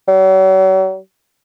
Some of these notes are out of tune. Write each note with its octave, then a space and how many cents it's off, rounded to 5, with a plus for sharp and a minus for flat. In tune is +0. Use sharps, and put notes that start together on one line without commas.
F#3 +40